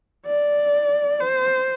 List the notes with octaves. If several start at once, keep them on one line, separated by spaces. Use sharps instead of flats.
D5
C5